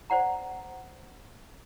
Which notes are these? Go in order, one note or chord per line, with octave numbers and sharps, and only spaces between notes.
C5 D5 F#5 A#5